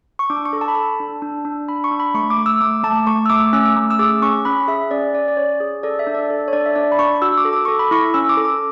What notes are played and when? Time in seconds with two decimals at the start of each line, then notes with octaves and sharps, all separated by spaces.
0.19 C#6
0.30 D4 D6
0.45 C#6
0.53 A4
0.61 A5
0.68 B5
0.75 A4 A5
1.00 D4
1.22 D4
1.45 D4
1.69 D4 B5
1.84 C#6
1.91 D4
2.00 B5
2.14 A3 C#6
2.30 D6
2.38 A3
2.46 E6
2.61 A3 D6
2.84 A3 A5
3.07 A3 C#6
3.26 E6
3.30 A3 D6
3.53 C#4 E6
3.76 A3
3.91 E6
3.99 G#4 D6
4.22 C#4 C#6
4.45 C#4 B5
4.68 G#4 E5
4.91 C#4 D5
5.14 C#4 D5
5.28 D5
5.37 C#4 C#5
5.60 G#4
5.83 A4 D5
5.99 E5
6.07 D4
6.14 D5
6.30 A4
6.48 C#5
6.53 D4 D5
6.66 E5
6.76 D4 D5
6.92 B5
6.99 D4 C#6
7.22 F#4 E6
7.38 D6
7.45 A4
7.53 D6
7.65 A4 C#6
7.79 B5
7.91 E4 C#6
8.14 C#4 E6
8.29 D6
8.37 A4
8.45 D6